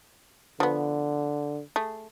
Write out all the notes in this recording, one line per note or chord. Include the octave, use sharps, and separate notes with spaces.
D3 F3 B3
A3 G#4